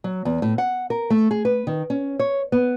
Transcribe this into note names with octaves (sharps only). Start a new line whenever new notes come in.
F#3
E2
A2
F#5
A#4
A3
G#4
B4
D#3
C#4
C#5
B3